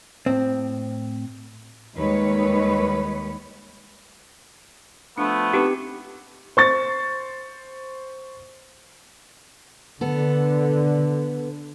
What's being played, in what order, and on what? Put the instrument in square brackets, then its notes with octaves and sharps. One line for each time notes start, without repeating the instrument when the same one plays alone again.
[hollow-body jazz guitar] A2 C4
[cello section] D#2 D#3 G3 G#3 B4 C#5
[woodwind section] F3 A3 B3 [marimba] D4
[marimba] C4 D#4 B4 [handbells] G4
[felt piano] C5 C#6 A6
[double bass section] D3 [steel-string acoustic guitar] B3 A4